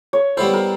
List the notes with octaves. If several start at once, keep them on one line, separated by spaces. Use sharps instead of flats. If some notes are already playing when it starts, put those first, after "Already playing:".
C#5
G3 B3 E4 A4 C5
A#4